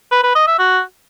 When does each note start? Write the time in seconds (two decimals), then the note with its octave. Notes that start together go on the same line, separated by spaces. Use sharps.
0.12 B4
0.24 B4
0.35 D#5
0.47 E5
0.59 F#4